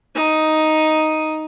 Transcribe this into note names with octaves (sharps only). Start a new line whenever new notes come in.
D#4 D#6